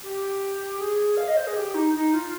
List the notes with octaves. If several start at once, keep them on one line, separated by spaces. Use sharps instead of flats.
G4
G#4
F5
D#5
C5
G#4
G4
D#4
D#4
F4